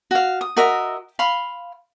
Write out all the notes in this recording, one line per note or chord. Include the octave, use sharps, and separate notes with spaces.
F#4 F5
D#6
F#4 A#4 D#5 E5
F5 B5 C6